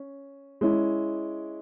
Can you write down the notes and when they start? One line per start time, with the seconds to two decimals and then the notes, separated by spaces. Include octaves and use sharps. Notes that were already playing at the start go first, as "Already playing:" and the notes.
Already playing: C#4
0.61 G#3 C#4 E4